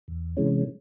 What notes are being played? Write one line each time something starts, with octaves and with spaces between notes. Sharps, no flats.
E2
C3 E3 G#3 C#4